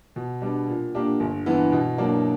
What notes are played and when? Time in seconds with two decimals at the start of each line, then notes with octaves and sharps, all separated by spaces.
0.16 B2
0.42 G3 B3 D4
0.68 A#2
0.95 A#3 D4 G4
1.20 G1
1.46 G2 E3 B3 E4
1.72 B2
1.98 F#3 A#3 D4